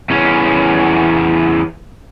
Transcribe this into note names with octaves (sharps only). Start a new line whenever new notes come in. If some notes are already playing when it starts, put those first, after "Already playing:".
E2 C#4